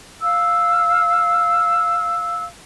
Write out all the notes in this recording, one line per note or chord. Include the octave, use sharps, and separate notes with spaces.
F5 E6